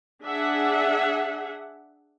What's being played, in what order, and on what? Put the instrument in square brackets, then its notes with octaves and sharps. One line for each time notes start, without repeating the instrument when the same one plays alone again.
[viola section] D4 G#4 E5 F#5